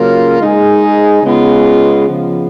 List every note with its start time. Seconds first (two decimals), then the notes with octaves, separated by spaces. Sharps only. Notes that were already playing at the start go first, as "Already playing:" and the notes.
Already playing: C#3 F#3 A#3 F4
0.40 G#3 D#4 G#4
1.23 C#3 G#3 B3 F4
2.06 C#3 F3 B3